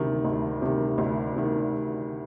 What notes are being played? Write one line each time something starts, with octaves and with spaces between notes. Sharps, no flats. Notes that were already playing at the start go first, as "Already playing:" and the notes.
Already playing: D2 C3 D#3
D2
C3 D#3
D2
C3 D#3